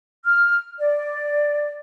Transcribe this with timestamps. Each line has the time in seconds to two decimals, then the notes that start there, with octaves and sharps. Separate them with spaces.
0.25 F6
0.79 D5